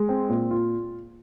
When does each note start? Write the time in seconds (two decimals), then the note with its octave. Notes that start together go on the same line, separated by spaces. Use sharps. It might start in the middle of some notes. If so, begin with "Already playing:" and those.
Already playing: G#3
0.09 C4
0.29 A#2
0.51 F4